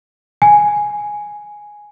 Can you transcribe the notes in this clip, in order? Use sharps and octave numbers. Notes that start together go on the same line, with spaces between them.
G#5